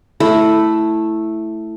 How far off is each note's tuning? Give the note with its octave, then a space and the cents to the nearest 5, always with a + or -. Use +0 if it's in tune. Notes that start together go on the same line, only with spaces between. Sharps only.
A3 +0 E4 +0